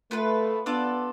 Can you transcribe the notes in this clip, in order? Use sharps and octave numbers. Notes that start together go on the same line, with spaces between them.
A3 B3 F4 B4
B3 D4 F4 A4 D5